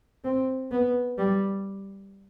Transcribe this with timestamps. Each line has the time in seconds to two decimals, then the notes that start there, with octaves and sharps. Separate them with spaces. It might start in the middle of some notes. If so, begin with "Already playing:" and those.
0.24 C4
0.72 B3
1.18 G3